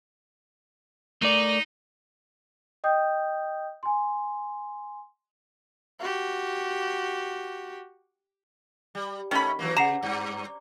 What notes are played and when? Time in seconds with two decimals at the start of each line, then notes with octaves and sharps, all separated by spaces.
1.22 A3 D#4 A#4 D5
2.84 D#5 G5 D#6 G6
3.83 G#5 C6
6.00 F#4 G4
8.95 G3
9.31 D#3 A3 C#4 B5
9.59 E3 F#3 A#3
9.77 C#3 F#5 A#5 C7 E7
10.03 G2